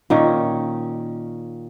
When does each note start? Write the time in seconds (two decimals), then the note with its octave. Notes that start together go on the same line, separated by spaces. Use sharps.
0.10 A#2 D#3 C#4